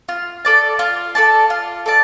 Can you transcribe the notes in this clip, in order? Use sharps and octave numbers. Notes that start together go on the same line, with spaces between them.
F4
A4 D5 A5
F4
A4 D5 A5
F4
A4 D5 A5